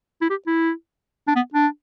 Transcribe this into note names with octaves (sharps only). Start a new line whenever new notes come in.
E4
G4
E4
D4
B3
D4